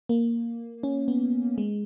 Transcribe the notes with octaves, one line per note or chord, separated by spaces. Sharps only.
A#3
C#4
B3
G#3